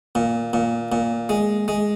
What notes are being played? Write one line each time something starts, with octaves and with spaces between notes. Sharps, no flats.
A#2
A#2
A#2
G#3
G#3